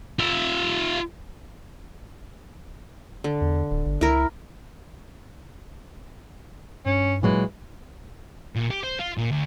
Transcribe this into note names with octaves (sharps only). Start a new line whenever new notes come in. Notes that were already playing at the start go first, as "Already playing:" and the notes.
F4 E5
D3
E2
D1
G1
C#2 E4 A#4
G2 C#4
A#2 E3 F#3 G#3
A#2
G4
C5
F4
A#2
D2